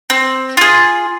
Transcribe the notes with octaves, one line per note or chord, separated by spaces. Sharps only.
C4
F4 G#4